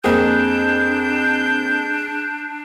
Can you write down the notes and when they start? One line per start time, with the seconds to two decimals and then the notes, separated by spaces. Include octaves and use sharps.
0.04 F2 A#3 C4 D4 G#4 G6